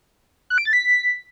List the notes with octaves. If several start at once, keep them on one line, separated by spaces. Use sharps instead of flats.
F#6
D7
A6
B6